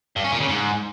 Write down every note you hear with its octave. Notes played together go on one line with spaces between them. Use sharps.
G2
C#4
A#2
C#3
G#2